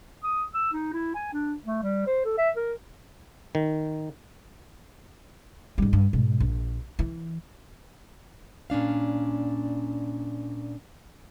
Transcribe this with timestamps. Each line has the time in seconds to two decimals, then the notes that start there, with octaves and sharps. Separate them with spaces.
0.24 D#6
0.54 E6
0.73 D#4
0.93 E4
1.15 G#5
1.33 D4
1.65 A3
1.83 G3
2.07 C5
2.24 A4
2.38 E5
2.56 A#4
3.55 D#3
5.78 G#2 G3
5.93 G2
6.13 G#2 B2
6.40 A#1
6.99 E3
8.70 A#2 C#4 D4 F5